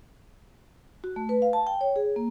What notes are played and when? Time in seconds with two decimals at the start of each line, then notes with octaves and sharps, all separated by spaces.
1.04 F#4
1.16 A3
1.29 B4
1.42 F5
1.53 A5
1.67 G5
1.81 C#5
1.96 G#4
2.16 A#3